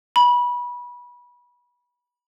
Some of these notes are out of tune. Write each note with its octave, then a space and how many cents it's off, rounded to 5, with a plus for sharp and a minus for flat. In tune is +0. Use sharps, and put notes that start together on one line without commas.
B5 -25